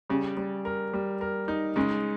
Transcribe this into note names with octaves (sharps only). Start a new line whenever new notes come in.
C#3 G3
G3
A#4
G3
A#4
D#4
C#3 G#3